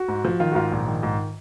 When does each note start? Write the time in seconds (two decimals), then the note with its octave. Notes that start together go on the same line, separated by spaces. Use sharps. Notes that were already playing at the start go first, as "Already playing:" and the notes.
Already playing: F#4
0.08 G#2
0.25 F3
0.40 D#3 F4
0.52 F#4
0.55 G#2 F4
0.72 A#1
0.87 D#3
1.03 G#2